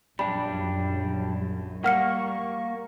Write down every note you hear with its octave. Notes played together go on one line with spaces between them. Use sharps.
A#1 F#2 G3 D4 B5
G3 A#3 F#5 C#6 F6 C#7